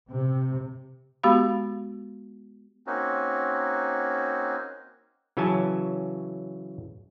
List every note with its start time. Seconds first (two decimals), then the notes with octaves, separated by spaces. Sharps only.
0.10 C3
1.23 G#3 B3 F#4 G4 F5 B5
2.87 A#3 C4 C#4 D#4 F#4
5.37 C#3 E3 F#3 C#4 G#5 A5